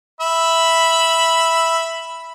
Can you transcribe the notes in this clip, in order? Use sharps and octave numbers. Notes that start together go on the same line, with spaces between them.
E5 B5